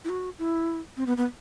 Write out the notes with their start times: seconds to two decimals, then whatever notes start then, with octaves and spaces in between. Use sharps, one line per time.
0.05 E4
0.09 F#4
0.39 E4
0.97 C4
1.07 B3
1.17 B3